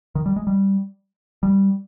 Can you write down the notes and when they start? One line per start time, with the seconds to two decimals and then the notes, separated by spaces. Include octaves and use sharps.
0.15 D#3
0.26 G3
0.36 G#3
0.47 G3
1.43 G3